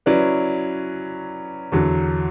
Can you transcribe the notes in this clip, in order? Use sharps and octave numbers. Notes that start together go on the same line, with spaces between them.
F#3 C#4 E4 B4 D5
E2 D3 F#3